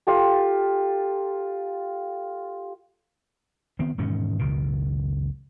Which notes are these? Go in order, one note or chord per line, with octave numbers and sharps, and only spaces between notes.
F4 G4 A4
D#3 B3 C4
E1 G#2 D#3 C#4
F#1 C#2 B2 D#3